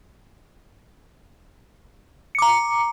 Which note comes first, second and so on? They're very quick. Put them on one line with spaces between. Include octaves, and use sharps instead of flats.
C#7 D6 A#5